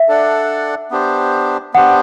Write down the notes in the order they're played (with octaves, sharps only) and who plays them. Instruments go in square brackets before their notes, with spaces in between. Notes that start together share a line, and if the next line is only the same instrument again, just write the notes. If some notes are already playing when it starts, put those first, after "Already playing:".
Already playing: [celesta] E5
[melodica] D4 A4 D5 F#5
B3 D4 G4 C5
[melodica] B3 D4 G4 C5 [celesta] F#5